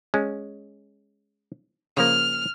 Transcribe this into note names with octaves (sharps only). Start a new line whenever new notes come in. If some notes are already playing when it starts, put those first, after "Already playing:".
G#3 C#4
C#3 F3 A#3 F6